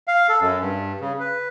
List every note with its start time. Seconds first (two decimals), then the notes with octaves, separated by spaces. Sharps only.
0.07 F5
0.29 A4
0.41 F#2
0.61 G2
1.00 C#3
1.20 B4